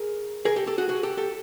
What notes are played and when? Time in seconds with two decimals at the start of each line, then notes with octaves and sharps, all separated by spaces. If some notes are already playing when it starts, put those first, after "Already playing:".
Already playing: G#4 A#4
0.45 G#4 A#4
0.56 G4 A4
0.67 G4 A4
0.78 F#4 G#4
0.89 F#4 G#4
1.03 G4 A4
1.17 G4 A4